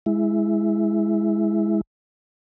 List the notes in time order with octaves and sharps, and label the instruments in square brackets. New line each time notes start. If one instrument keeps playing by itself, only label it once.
[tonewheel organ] G#3 E4